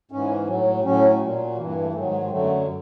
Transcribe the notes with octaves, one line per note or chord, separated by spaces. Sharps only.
G#2 E3 C#4
A2 F#3
A2 F#3 C#4
A#2 F#3
G2 E3 A#3
A#3
A3
G#2 D#3 F#3 A3
G#3
G#3
F#2 D3 F#3 A3